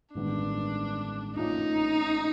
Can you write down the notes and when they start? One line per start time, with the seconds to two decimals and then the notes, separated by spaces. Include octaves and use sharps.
0.14 A1 G2 D#3 G#3 B3 D4
1.36 A#1 A#2 F3 A3 C#4 D#4